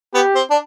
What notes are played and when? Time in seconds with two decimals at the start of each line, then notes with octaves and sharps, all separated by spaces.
0.14 B3 G4
0.35 C4
0.50 D4